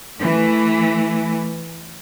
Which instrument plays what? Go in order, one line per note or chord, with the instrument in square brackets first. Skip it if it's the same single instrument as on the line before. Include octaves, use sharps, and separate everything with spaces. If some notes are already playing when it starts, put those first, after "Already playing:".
[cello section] E3 A3